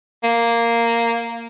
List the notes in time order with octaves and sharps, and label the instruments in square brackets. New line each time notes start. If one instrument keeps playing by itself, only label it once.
[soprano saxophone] A#3